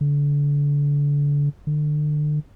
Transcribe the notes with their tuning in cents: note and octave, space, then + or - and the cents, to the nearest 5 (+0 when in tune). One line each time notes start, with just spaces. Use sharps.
D3 -30
D3 +30